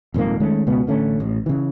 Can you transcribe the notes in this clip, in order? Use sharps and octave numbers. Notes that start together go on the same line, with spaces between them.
D#1 F2 G#2 A#3
D#3 G#3 A3 C#4
C#2 B2 B3
A1 D3 A3 C#4
A1
C#3 E3